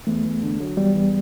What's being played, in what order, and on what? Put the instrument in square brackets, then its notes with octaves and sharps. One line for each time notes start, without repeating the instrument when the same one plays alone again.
[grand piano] E2 [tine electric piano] A3
[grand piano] E2
D3
F#3
[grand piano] E2 [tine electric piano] G3
[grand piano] E2